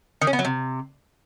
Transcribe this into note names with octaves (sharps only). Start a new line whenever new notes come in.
D#3
C#4
B3
F#3
C3